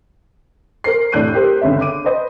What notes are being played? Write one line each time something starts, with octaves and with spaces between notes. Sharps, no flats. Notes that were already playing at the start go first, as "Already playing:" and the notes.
A#4 C5 C7
F1 A2 D4 F#6 G6 D#7
G4 A#4 C5
G1 C#2 C4 C#5 E5
D6 D#7
B4 C5 D#5